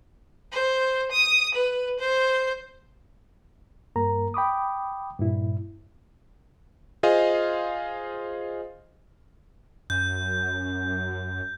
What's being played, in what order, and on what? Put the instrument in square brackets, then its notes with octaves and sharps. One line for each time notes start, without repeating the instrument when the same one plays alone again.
[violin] C5
D#6
B4
C5
[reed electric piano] G2 A#3 A#4 A#5
G5 B5 D6 D#6
G2 A#2 E4
[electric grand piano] F4 G#4 C5 D#5 F5
[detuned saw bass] F#2 [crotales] G6